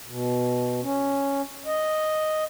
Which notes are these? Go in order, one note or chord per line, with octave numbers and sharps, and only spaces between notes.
B2
C#4
D#5